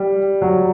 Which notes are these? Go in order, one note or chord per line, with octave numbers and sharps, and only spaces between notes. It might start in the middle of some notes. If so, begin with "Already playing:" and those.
Already playing: G3
F#3